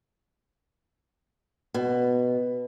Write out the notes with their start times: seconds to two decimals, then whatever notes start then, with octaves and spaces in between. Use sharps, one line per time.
1.74 B2